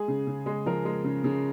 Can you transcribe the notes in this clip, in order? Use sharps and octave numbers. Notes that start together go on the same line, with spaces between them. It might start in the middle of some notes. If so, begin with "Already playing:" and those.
Already playing: G#3 G#4
C#3
C#3
G#3
F3 A#4
G#3
C#3
C#3